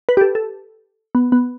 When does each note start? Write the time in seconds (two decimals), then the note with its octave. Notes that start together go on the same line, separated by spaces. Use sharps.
0.09 B4
0.17 G4
0.21 A4
0.35 A4
1.15 B3
1.32 B3